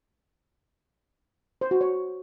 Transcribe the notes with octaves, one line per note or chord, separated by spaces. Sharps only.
C5
F#4
C#5